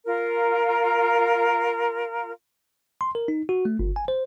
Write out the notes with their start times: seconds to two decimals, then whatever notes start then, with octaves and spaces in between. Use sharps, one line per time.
0.06 F4 A#4
3.01 C6
3.15 A#4
3.28 D#4
3.49 F#4
3.65 A3
3.79 G1
3.96 G#5
4.08 C5